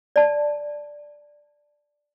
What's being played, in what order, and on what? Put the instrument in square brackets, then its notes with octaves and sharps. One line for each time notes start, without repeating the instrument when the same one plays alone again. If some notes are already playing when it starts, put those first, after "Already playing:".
[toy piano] D5 A5